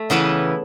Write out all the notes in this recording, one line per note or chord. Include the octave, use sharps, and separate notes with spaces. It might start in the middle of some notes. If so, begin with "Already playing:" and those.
Already playing: A3
C#3 E3 B3 E4